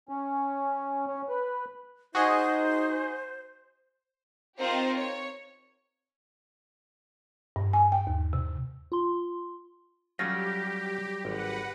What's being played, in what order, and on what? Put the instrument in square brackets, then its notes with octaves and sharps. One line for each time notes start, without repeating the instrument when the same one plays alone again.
[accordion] C#4
C#4
B4
[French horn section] D#4 [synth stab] F#4 G#4 D#5 [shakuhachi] C5
[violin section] C4 D#4 F4 G4 A#4 C5
C#5
[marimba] G2
G#5
G5
D#2
C3
[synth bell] F4 C6
[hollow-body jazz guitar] F#3 G3 [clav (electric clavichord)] A3 C#4 F4 [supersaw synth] G4 [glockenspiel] A#6
[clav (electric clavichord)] G#1 [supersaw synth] B4 F#5